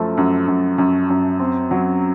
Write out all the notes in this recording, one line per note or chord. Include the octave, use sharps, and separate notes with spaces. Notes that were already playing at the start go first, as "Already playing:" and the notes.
Already playing: F#2 F3 A3
F#2
F#2
F#2
F#2
C4
F#3